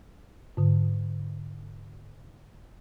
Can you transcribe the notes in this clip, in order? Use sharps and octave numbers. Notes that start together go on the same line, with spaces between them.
G#2 D3